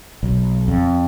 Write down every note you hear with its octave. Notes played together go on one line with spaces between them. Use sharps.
B1
F2